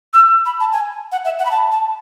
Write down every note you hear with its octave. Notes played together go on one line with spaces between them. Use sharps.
E6
B5
A5
G#5
F#5
E5
F#5
B5
A5
A5